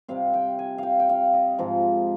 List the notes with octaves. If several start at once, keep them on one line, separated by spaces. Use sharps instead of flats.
C3 G3 C4 F5
G5
G#5
F5 G5
G5
F5
D#5
G#2 F3 G#3